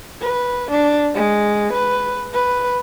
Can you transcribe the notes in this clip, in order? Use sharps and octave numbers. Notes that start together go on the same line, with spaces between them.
B4
D4
G#3
B4
B4